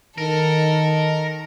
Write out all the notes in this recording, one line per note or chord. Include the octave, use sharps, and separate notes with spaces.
D#3 A4 A#4